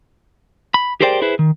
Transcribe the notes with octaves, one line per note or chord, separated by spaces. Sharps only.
B5
G4 G#4 A#4 C5 D5 G5
E4 G#4 B4 C5
D#3